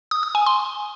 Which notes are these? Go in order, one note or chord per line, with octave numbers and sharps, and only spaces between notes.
D#6
D#6
G#5
C6